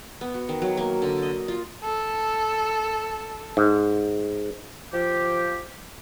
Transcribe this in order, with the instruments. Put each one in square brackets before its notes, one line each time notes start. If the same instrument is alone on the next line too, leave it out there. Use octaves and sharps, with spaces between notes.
[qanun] B3
F#4
D#3
F#3
A#3
D3
D#5
F4
[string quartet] A4
[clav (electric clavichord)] G#2
[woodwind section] F3 G4